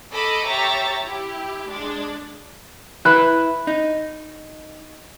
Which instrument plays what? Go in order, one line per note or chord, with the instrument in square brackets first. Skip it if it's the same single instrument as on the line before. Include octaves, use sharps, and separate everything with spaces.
[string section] A4 D#5 B5 D6 E6
G4 C#5 E5 A#5 A6
E4 G4
G#3 D4
[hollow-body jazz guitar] E4 B4 [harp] B5 F#6
[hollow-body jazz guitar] D#4